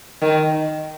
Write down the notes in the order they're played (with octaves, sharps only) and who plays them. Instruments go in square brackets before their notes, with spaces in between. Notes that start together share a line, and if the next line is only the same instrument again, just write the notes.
[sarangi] D#3